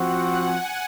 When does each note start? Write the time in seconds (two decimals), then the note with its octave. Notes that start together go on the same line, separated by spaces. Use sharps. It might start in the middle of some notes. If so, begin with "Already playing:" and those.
Already playing: F3 C4 F#4 F#5
0.27 G#5